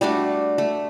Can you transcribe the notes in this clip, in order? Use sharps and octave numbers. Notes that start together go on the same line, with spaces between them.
G3 A3 D4 F#4
A3